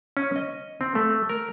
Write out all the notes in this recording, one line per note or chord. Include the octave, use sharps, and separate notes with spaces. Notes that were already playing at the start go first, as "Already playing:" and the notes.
C#4
D#5
C4
A3
A#4